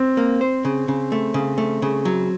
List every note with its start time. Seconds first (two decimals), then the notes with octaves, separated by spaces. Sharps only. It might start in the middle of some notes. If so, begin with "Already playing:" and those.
Already playing: C4
0.17 A#3
0.41 C5
0.65 C#3
0.88 C#3
1.12 A3
1.34 C#3
1.58 A3
1.82 C#3
2.05 F#3